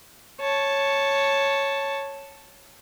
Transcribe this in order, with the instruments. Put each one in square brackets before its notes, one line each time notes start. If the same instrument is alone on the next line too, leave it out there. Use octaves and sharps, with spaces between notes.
[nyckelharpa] C#5 A5